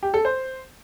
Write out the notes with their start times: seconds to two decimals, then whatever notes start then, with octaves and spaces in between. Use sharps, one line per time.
0.03 G4
0.14 A4
0.25 C5